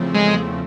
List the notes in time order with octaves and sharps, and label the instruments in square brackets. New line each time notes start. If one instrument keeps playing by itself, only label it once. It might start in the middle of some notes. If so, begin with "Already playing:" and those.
Already playing: [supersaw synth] E2 C#3 F3 A3 C4
[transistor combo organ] G#3